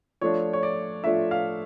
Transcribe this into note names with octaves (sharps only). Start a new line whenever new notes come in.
F3 A3 D4 F4 C#5
C#5
D5
F3 A3 D4 F4 E5
F5